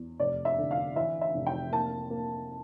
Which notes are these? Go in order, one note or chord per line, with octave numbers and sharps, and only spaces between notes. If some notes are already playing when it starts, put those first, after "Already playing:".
Already playing: E2
F1 D5
E5
D3
F5
E3 E5
E5
F1
G5
A#3 A5
A#3